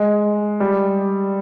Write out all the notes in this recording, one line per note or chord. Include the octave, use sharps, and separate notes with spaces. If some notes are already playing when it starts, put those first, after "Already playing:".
Already playing: G#3
G3